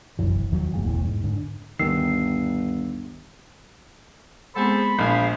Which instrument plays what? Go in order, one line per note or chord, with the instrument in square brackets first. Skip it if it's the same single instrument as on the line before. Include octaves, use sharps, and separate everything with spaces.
[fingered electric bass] F1 A#1 F#2 E3
D#2 D#3 F3 F#3
F#1 G#3 A#3
E1 A#1 E2 A2
G#2
G#2 D3
[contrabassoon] G1 [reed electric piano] D2 D#3 E6 [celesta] C7
[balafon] G#3 B3 C4 [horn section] G#4 A4 C5 [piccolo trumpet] B5
[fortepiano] A#1 [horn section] G#4 C5 F5